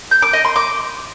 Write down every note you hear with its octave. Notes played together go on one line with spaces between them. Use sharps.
G6
D6
D#5
C6
D6